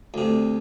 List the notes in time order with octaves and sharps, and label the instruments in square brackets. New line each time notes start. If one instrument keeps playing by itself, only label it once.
[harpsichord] D2 C3